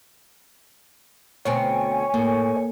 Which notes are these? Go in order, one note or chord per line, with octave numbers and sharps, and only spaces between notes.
D2 B2 C4 C#5 G#5
A2 A#3